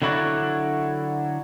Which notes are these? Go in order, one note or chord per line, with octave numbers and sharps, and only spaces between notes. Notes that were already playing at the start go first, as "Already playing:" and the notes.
D3 F#3 E4 F#4 C#5 D5